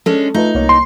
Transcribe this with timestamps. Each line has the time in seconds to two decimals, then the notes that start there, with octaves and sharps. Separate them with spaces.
0.06 G#3 C#4 D4 A4
0.34 A3 D#4 F4 B4
0.55 C2 A#3 C#5
0.69 C6